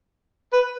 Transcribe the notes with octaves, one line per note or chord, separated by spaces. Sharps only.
B4